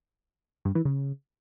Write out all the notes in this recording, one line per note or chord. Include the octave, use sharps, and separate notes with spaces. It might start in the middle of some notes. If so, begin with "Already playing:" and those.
G2
E3
C#3